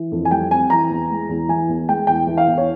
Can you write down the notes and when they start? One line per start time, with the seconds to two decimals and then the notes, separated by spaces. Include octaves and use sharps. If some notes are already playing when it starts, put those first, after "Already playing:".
Already playing: E3
0.12 F2
0.25 G#5
0.31 G3 G5
0.51 C4 G#5
0.70 E3 A#5
0.90 E2
1.10 G#3
1.29 E2
1.49 E3 G#5
1.69 E2
1.89 G#3 G5
2.07 E2 G5
2.27 E3
2.38 F5
2.47 E2
2.58 C#5